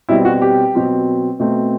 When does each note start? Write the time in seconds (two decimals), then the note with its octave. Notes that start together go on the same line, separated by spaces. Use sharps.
0.09 B2 G3 C4 E4
0.25 F#4
0.42 G4
0.75 B2 F#3 C4
1.40 B2 A3 C4